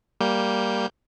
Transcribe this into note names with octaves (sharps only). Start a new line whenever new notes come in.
G3 A#3 G6